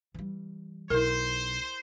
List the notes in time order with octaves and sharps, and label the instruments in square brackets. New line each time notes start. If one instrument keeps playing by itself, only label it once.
[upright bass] E3 G3
[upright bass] B1 [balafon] E4 A#4 [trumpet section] C5